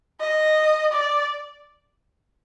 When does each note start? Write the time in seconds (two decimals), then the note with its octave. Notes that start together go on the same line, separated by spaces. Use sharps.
0.20 D#5
0.92 D5